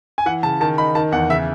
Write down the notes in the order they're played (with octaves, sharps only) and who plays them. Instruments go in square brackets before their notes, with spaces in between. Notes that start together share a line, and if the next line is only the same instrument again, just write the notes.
[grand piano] G#5
E3 F#5
C#3 A5
D#3 A5
D#4 B5
D#3 A5
E2 F#5
C#3 E5